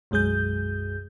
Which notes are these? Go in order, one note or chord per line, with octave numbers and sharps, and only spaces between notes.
B1 F#2 G#3 G#4 G6